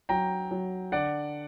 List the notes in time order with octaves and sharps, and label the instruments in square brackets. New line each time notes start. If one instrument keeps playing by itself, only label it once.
[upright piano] F#3 [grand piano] G5 A#5
[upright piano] F#3
[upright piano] D3 [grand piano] D5 F#5